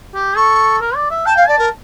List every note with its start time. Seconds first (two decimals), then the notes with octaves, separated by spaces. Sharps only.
0.15 G4
0.36 A4 C#6
0.81 A#4
0.95 D5
1.11 E5
1.25 G5 A5
1.36 F5
1.47 D5 A5
1.58 A#4